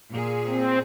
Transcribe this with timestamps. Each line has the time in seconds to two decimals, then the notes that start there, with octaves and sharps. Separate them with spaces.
0.11 A#2 G#4
0.47 C4